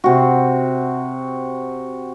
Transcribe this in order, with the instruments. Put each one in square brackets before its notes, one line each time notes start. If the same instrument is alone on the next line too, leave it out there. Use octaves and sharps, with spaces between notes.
[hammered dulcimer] C3 F#4